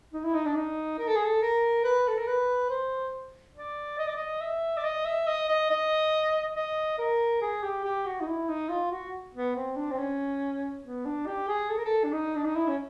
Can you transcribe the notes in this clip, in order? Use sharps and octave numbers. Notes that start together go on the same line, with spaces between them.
D#4
E4
D#4
D4
D#4
A#4
A4
G#4
A4
A#4
B4
A4
A#4
B4
C5
D5
D#5
D5
D#5
E5
D5
D#5
E5
D#5
D#5
D#5
D#5
A#4
G#4
G4
G4
F#4
D#4
E4
D#4
F4
F#4
B3
C4
D4
C4
C#4
B3
D4
G4
G#4
A4
A#4
A4
D4
D#4
D4
D#4
E4
C#4